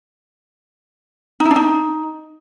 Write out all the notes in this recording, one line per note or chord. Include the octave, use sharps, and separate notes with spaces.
D#4
E4
D4
D#4